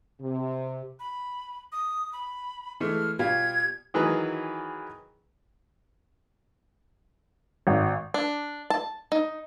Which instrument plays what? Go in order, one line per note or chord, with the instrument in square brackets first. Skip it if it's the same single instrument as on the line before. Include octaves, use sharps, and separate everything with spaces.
[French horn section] C3
[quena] B5
D#6
B5
[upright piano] E3 G#3 A3 [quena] F6
[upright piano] B2 G3 F4 [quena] G#6
[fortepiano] D#3 E3 F#3 G#4 B4
[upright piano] G#1
[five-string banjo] D4
A5
D#4